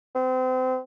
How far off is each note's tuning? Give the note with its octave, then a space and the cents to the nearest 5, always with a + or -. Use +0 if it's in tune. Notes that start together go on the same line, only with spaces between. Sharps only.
C4 -30